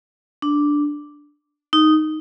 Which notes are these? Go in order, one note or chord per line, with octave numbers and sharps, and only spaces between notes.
D4
D#4